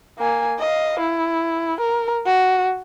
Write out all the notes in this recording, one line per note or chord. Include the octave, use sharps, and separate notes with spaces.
A#3 G#5
D#5 F5
E4
A#4
F#4